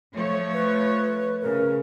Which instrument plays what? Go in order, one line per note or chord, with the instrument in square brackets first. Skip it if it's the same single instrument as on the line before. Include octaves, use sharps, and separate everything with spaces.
[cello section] F3 A3 C#5
[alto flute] B4
[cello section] C#3 [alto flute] A#4